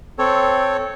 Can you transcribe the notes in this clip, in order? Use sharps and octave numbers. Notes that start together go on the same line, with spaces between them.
C4 A4 C#5